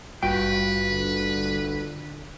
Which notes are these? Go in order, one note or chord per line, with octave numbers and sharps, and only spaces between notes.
G#1 G2 F4 F#4 B4 G5
D3